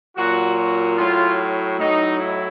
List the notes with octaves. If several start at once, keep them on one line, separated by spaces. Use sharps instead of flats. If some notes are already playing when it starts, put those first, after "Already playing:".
A#2 F#3 F#4
F#4
A2 F#3 F4
A2 F#3 D#4
E4